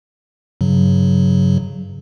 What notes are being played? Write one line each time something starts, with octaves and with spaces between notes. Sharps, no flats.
G2 C#3 F#3